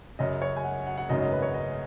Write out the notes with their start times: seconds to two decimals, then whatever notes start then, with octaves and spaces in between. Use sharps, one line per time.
0.19 F#2 C#3 F#3 D#5
0.42 C#5
0.56 G#5
0.64 F#5
0.87 F#5
0.98 F#5
1.09 G#1 F#2 C#3 F#3 C#4 D#5
1.20 D#5
1.32 B4
1.42 C#5
1.54 D#5